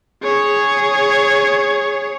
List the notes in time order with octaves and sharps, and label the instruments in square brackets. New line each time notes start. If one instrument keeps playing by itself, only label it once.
[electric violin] G#4 C#5